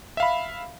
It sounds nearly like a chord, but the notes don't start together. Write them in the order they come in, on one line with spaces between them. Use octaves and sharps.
E5 F5 B5